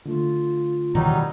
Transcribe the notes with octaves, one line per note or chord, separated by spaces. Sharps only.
D3 A3 F4
B2 D#3 E3 F#3 G3 D#4